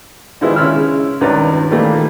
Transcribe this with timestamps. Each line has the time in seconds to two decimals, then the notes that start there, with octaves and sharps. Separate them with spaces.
0.41 D#3 F3 G3 G#3 B3 E4
0.56 C#3 G#3 E4 C#5 E6 F6
1.21 C#2 G2 D#3 B4 D5 A#5
1.70 A#2 D#3 E3 G3 A3 A#3